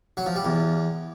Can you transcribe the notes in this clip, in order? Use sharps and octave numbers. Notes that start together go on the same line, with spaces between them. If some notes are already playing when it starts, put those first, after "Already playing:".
F#3
F3
G3
E2